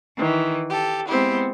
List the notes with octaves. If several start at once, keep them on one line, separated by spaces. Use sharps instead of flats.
D#3 E3
G4 A4
G#3 B3 C4 E4 G4